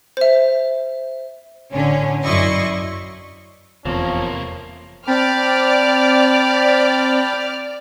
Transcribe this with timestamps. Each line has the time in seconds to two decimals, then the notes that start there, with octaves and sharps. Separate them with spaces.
0.17 C5 E5
1.73 A1 D3 C#4
2.24 F#2 E4 D5 D#5 C6 C#6
3.85 F1 E2 C3 F3 A#3 C#4
5.07 C4 D5 G5 A5 B5 D6 F6